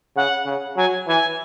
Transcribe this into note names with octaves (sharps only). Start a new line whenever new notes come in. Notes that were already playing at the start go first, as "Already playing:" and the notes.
C#3 F#5
C#3
F#3 G#5
E3 G#5